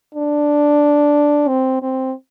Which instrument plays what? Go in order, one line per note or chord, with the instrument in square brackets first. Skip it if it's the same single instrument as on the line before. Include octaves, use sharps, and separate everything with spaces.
[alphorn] D4
C4
C4